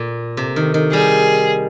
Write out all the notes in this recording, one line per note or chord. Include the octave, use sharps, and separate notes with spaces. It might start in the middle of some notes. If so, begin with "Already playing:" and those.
Already playing: A#2
C3
D#3
D#3
G3 G#4